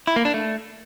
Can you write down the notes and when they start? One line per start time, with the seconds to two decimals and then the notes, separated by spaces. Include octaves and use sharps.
0.07 E4
0.16 A#3
0.25 D4
0.34 A3